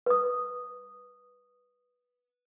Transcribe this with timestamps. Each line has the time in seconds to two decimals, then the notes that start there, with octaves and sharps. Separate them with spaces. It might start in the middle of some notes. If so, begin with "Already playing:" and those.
0.06 B4 D#6